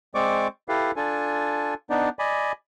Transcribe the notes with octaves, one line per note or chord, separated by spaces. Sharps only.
G#3 C4 C5 D5 C#6 D6
E4 G4 A4 B4 F5
D4 F4 A4 G#5
B3 D4 D#4 D5
D5 D#5 G#5 B5